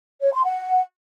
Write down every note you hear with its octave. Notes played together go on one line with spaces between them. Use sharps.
C#5
C6
F#5